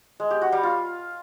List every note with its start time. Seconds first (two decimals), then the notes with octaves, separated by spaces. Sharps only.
0.20 G#3
0.31 G4
0.41 F#4
0.52 G3
0.63 F4